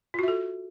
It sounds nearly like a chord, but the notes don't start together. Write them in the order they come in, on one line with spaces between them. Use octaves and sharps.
F4 F#4 E5 A4